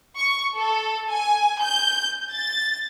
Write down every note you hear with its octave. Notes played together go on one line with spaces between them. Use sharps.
C#6
A4
G#5
G6
A6